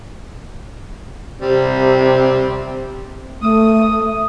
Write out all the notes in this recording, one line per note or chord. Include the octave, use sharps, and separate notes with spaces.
C3 G3 C4
A3 D#6